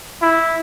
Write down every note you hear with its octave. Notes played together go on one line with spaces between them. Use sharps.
E4